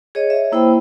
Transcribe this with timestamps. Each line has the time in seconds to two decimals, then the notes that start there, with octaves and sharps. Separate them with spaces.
0.15 G#4 C#5 D#5
0.30 E5
0.52 A#3 E4 C5 G5 B5